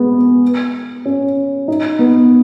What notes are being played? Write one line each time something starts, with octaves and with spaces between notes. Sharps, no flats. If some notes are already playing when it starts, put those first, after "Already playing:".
Already playing: G#3 B3
C#4
D#4
B3